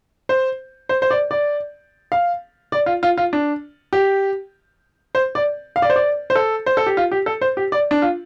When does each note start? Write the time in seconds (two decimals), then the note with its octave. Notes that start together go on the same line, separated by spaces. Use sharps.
0.29 C5
0.89 C5
1.02 C5
1.11 D5
1.31 D5
2.12 F5
2.72 D5
2.86 F4
3.03 F4
3.17 F4
3.33 D4
3.93 G4
5.15 C5
5.35 D5
5.76 F5
5.82 D5
5.90 C5
5.96 D5
6.30 C5
6.35 A4
6.66 C5
6.77 A4
6.86 G4
6.97 F4
7.12 G4
7.26 A4
7.41 C5
7.57 G4
7.72 D5
7.91 D4
8.02 F4